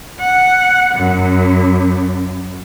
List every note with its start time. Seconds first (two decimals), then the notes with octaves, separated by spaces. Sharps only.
0.20 F#5
0.94 F#2